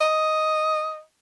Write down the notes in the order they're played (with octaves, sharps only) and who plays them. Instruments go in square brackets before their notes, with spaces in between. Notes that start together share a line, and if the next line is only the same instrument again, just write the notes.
[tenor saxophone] D#5